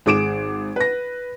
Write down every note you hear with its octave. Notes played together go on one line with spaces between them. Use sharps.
G#1 G#4 D6 D7 E7
B4 A#6